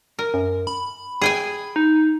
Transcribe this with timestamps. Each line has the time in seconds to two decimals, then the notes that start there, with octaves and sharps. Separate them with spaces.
0.19 A#4
0.34 F#2
0.67 B5
1.22 G#4 G5 G#5
1.76 D#4